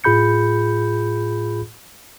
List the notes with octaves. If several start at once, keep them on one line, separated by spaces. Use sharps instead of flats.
A2 F4 G#4 B5 G6 C#7